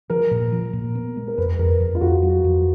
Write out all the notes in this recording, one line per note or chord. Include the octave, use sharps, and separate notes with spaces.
F3 A#4
A#2
F3
A#2
B3
G#3
A#4
F2 B4
F2 A#4
F2
F4
F2 F#4
F#3
F2